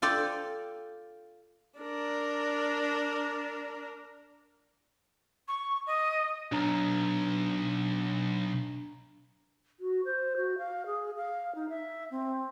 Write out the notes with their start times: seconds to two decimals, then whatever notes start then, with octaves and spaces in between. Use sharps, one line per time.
0.02 F4 A4 D5 G5
1.79 D4 A#4
5.48 C#6
5.87 D#5
6.52 B1 D4 A#5
9.80 F#4
10.05 C5
10.37 F#4
10.58 F5
10.86 G#4
11.16 F5
11.55 D#4
11.69 E5
12.11 C4